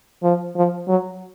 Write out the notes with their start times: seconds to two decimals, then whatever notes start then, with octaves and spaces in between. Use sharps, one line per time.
0.23 F3
0.56 F3
0.88 F#3